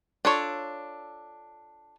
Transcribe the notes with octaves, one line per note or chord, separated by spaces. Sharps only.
D4 F4 A4 C#5